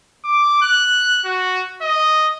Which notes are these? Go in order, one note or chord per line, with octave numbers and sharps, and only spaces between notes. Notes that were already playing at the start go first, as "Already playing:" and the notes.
D6
F#6
F#4
D#5